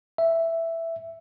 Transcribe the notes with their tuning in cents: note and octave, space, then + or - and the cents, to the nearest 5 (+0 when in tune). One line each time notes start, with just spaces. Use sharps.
E5 +5